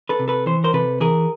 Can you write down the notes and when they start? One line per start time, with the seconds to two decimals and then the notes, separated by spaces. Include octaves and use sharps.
0.09 A4 B4
0.19 C3
0.28 A4 B4
0.46 E3 C5
0.64 A#4 C5
0.73 C3 A4 B4
1.00 E3 G#4 A#4